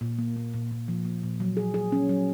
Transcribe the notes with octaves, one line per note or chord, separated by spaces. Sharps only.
A#2
A#3
A#2
A#2
A#2
F3
A#3
A#2
F#3
G#4
G#4
C#4
F#3